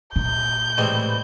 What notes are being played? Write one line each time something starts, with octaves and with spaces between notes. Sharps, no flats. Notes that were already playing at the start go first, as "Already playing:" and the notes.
A#2 G6
A2 C3 E3 G3 G#3 C5